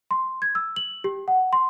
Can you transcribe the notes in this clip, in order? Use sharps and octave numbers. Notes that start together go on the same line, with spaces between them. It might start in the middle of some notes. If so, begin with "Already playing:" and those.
C6
G#6
E6
F#7
G4
F#5
C6